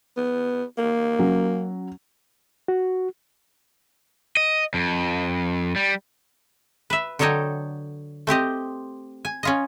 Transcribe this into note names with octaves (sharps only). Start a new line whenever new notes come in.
B3
A#3
F#3 C#4
F#4
D#5
F2
G3
B4 E5
D3 F#3 A4 C#5 D#5 G5
A3 C4 G4 D#5
G#5
C#4 F4 D#5